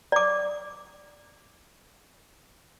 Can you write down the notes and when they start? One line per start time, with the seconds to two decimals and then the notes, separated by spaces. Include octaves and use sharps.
0.12 D5 D6